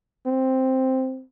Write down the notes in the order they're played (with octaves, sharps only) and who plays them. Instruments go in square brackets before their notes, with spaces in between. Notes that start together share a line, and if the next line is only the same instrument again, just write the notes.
[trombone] C4